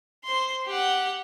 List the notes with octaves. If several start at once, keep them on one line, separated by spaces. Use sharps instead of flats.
C5 C6
G4 F#5